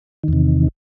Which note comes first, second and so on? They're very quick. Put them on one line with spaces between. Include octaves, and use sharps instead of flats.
D#3 E2 C3